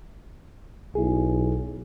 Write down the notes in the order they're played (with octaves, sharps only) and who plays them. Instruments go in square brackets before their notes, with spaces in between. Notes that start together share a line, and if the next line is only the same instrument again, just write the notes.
[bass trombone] B1 [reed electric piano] E4 G#4